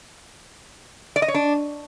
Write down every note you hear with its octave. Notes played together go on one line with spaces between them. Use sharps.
D5
D#5
C#5
D4